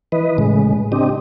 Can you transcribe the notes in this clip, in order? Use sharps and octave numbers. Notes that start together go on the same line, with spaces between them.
E3 B4 D#5
A2 C#3 G#3
C4 D4 G4 D#5